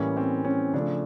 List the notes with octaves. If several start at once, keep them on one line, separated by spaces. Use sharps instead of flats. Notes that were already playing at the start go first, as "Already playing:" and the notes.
Already playing: A2 E3 G3 A#3 C#4
C4
C#4
C#3 F3 A3 D4